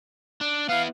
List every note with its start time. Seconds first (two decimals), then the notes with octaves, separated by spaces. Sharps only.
0.41 D4
0.69 B3 E4 F5